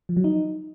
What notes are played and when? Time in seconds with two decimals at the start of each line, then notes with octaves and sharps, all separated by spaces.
0.09 F3
0.17 F#3
0.24 D#4